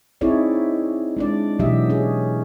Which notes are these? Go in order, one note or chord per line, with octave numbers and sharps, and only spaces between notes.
C4 D#4 E4 G#4 C#5 D5
G#3 D4 D5
B2 E3 F#3 G4 D#5 E5
C#4 G#4